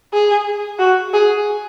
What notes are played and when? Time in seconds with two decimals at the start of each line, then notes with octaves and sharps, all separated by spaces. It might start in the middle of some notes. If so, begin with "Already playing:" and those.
0.13 G#4
0.79 F#4
1.13 G#4